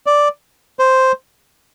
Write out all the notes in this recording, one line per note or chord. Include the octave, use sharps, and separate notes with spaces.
D5
C5